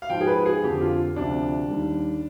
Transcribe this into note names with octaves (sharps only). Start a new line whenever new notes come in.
F5
G#2 F3 G5
G#4
B4
G#4
F2 D3 F3 G4
F4
D2 C3 F3 D4
D#2 D#3 G3